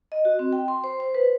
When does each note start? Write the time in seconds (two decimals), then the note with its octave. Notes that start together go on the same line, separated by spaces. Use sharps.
0.12 D#5
0.25 F#4
0.39 C4
0.53 G5
0.68 C6
0.84 C5
1.00 C5
1.14 B4